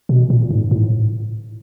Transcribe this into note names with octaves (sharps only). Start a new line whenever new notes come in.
B2
A#2
G#2
A2